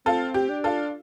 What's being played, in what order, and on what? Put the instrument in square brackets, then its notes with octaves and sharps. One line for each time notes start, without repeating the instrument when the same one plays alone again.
[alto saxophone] C4 [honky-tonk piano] F4 A4
[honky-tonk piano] G4
[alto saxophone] D4
[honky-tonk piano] F4 A4